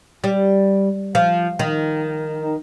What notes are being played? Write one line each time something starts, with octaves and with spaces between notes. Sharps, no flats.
G3
F3
D#3